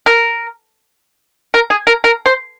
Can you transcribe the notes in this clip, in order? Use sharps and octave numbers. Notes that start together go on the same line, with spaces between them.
A#4
A#4
G#4
A#4
A#4
C5